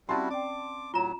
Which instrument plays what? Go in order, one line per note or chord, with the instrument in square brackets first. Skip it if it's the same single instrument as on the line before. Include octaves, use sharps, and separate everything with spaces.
[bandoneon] G3 E4 F#4 [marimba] C4 C#4 [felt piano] A5 C6
[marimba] D5 G5 [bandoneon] D6
[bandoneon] A2 F#3 [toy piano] F4 A#5